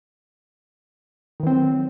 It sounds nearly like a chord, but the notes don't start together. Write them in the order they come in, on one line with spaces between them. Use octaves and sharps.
D#3 E3 C4 F#3